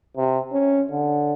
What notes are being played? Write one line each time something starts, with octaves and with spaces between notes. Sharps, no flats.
C3
C#4
D3